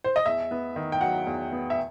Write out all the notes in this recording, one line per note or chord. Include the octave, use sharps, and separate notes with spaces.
C5
D#5
E2 E5
B3
D#3
G5
F#3 F#5
E2
B3
E5